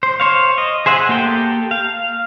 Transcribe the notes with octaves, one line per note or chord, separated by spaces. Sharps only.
C5
C5 C#5 F5
D#5
G#4 C5 E5 F#5 G#5
A#3 G4 A4 G5
F5